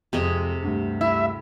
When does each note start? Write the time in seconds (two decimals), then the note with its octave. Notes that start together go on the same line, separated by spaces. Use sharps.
0.13 F2 C3 G#3 D#5
0.62 D2 G2
1.01 E4 E5